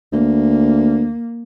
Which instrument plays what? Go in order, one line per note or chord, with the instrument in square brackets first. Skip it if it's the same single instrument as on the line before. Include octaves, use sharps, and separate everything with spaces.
[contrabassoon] D2 [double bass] A#3